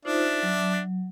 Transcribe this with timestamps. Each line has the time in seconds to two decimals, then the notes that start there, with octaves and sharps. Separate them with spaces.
0.05 D4 D#4 F4 C5 E5
0.43 F#3